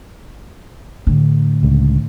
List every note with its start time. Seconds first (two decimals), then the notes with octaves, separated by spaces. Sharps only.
1.07 A2 D3
1.63 C#2